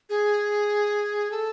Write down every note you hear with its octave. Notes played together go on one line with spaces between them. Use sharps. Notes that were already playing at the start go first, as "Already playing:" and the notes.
G#4
A4